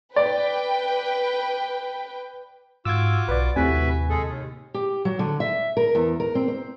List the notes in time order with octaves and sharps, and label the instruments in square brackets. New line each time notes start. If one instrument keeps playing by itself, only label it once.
[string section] B4 G5 [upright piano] D5
[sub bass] G#2 [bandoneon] F4 F#4 D6 [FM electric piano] E6 G#6
[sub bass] B1 [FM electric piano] B4 D5
[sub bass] D#2 [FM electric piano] A2 C3 G#5 [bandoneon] F#4 B4 E5
[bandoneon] G#3 G#4 A4
D#2
[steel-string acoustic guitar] G4
F#3
D3
E5
A#4
E2
A#4
C4
C5